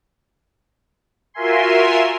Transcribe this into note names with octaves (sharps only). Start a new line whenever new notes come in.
F4 F#4 A#4 E5 G#5 C6